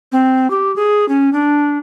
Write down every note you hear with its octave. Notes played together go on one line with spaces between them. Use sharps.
C4
G4
G#4
C#4
D4